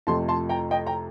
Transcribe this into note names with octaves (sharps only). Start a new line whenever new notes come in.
F2 C3 F3 A3 A5 C6
A5 C6
G5 A#5
D#5 G5
G5 A#5